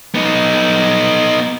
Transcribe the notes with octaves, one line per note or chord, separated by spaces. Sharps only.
B3 D#4